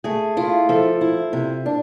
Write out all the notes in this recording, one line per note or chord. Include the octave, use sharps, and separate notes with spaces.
A3 G#4
E4 F4
F3 A4
E4
C3
D4